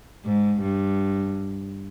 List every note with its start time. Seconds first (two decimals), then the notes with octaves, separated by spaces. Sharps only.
0.24 G#2
0.62 G2